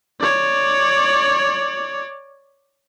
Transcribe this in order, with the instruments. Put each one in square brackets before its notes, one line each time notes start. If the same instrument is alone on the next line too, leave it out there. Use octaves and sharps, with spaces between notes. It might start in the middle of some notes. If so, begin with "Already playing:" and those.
[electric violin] C#5 D5